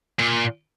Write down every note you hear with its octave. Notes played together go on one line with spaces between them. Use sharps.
A#2